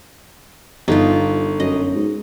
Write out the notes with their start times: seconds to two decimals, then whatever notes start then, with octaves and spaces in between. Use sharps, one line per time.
0.88 G1 D#4 F4
1.60 F#2 D#5
1.95 G#2